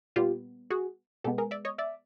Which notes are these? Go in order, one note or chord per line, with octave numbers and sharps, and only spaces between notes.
A#2 G3 B3 F4 G4
F#4 G#4
B2 G#3 B3 G4 A4
G#4 A#4
D5 E5
C#5 D#5
D5 E5